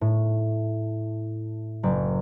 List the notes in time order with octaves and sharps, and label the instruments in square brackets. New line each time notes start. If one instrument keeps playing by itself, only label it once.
[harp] A2
F#1